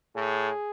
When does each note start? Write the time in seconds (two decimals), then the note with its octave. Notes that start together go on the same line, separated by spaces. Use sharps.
0.15 A2 G#4